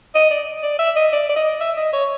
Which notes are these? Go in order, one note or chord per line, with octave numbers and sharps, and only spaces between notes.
D#5
D5
D5
E5
D#5
D5
D5
D#5
E5
D#5
C#5